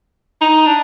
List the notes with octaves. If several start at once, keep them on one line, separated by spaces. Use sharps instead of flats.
D#4
D4